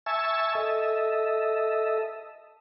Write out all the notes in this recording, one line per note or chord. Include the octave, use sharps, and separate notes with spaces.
E5 G#5 A5 C#6 E6
A4 D#5 E5